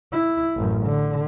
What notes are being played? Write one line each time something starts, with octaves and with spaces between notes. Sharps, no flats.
E4
A1 F#2
D3